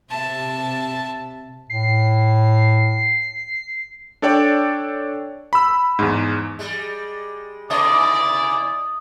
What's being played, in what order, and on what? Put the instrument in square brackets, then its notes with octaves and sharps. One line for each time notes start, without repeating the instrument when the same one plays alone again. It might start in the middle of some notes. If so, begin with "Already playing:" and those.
[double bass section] C3 [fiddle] E5 A5
[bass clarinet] A2 [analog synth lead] C7
[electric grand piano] D4 A4 C#5 D5 G5
B5 E6
E2 G#2
[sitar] G3 G#3
[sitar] C3 B3 D#5 [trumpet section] E4 D5 [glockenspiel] D#6